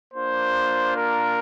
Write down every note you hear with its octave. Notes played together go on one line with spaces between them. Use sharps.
A#3 D4 F4 C5
A#4